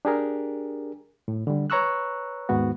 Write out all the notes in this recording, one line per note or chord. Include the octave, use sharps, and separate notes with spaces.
D4 G4 G#4 A#4
A2
D3 G3
B4 C#5 A#5 C#6 E6 F#6
D#2 G#2 D#3 B3 F#4